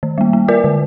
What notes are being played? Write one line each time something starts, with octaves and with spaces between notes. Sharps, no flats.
D#3
G3 A#3
A#3
F4 A#4 D5
D3